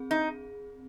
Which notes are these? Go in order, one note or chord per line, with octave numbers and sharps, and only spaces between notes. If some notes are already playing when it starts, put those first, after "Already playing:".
Already playing: C4 G#4
D#4